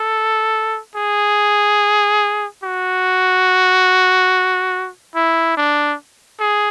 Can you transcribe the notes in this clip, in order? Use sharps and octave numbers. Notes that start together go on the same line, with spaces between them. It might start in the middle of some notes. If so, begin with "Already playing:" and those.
Already playing: A4
G#4
F#4
E4
D4
G#4